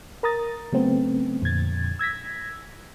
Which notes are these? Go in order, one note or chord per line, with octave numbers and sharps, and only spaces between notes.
A#4 A#5 D#6 A6
C#3 F#3 A3 B3 C4
F2 A#2 D3 G#6 A6
E6 G#6 A#6 B6